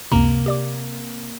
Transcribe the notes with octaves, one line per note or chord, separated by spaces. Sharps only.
C#2 F#2 C3 A#3 A#5
G4 D5 D6